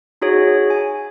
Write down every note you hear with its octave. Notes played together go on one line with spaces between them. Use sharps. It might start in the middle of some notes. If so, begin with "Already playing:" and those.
D#4 F#4 G#4 C#5
G#5